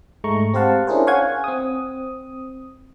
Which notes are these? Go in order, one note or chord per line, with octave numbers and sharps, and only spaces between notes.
G#2 G#3 A3 A#5 C#6
C4 G4 C5 F5 F#5 A5
C#4 D4 E4 G#4 A#4 C5
C#5 F5 F#5 G#5 G#6
C4 D#6